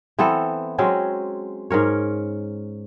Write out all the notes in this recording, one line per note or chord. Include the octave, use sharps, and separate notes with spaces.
E3 B3 C4 A4
F#3 G#3 C4 C#4
G#2 C#4 A#4 C#5